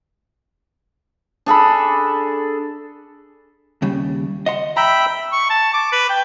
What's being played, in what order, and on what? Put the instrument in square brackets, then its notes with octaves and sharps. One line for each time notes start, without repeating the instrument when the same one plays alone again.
[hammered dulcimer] D4 G#4 A4 B5
[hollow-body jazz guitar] D#2 C#3 G3
D#5 F#5 C6
[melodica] E5 G5 B5 [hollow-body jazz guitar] A#5
[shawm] C#6
A5
D6
B4
G5